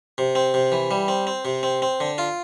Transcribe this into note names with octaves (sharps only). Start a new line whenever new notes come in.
C3
C4
C3
E3
G3
C4
C4
C3
C4
C4
D3
F4